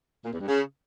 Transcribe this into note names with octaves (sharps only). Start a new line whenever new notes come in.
A#2
E2
G2
C#3